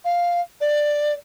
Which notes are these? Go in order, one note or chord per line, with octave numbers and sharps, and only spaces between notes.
F5
D5